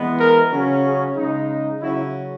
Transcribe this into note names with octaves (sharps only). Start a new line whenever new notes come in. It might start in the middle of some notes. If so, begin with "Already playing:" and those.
Already playing: E3 G#3 B3
A#4
C#3 F#3 C#4
G#4
C#3 G#3 D#4
C#3 F#3 C#4 E4